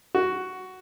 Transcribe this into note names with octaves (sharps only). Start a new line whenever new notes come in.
F#4